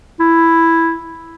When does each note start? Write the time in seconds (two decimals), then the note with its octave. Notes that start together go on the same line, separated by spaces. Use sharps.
0.20 E4